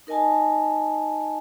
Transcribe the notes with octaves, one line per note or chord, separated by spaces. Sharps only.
D#4 A#4 D#5 G#5 A5